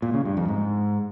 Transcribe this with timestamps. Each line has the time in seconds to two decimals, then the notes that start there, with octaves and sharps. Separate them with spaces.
0.02 A#2
0.14 C#3
0.25 G2
0.37 F2
0.48 G#2